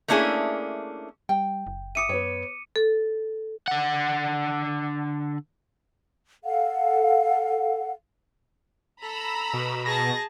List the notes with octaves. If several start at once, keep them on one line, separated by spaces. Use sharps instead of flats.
A3 A#3 C#4 D4 E4 G#4
G3 G5
F#1
E5 D6 D#6 C#7 D#7
F#2 B3 C#5
A4
D3 F#5
A4 F5 F#5
A4 A#5 B5 E6
B2
G#4 A5 A#6